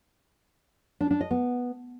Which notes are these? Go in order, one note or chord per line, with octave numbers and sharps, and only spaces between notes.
D4
D4
D#5
B3